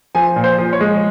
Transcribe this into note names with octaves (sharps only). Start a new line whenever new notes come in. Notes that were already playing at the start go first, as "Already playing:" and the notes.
F3 G#5
A#2
C5
F3
C#5
G#3